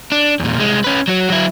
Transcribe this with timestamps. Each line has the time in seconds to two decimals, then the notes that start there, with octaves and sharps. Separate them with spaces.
0.12 D4
0.40 E2 A#2
0.57 C2 G#3
0.84 C#4 B4
1.08 F#3 F#4
1.30 F#3 E4